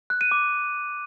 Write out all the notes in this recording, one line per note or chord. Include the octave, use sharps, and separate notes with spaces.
F#6
D#7
D6